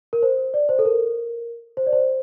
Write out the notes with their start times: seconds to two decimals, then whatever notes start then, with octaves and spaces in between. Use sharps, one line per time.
0.13 A#4
0.22 C5
0.54 D5
0.69 C5
0.79 A4
0.85 A#4
1.77 C5
1.87 D5
1.93 C5